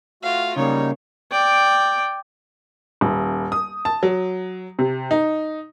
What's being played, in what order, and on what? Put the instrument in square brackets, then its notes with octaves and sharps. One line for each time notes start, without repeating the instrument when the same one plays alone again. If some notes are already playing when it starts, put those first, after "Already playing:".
[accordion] A3 F#4 [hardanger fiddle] F4 F5
[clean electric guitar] C#3 A#3 [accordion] G3 D#4 [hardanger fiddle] C#5
[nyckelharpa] D5 G5
[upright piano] D#1
D#6
A5
F#3
C3
D#4